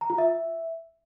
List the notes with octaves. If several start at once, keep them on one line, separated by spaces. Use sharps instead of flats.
A#5
F4
E5